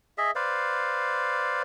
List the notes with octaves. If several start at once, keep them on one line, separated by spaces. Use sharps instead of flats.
G#4 D#5 E5
B4 C5 D5 F5